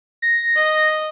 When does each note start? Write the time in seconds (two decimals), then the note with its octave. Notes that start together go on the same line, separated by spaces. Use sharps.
0.22 A#6
0.55 D#5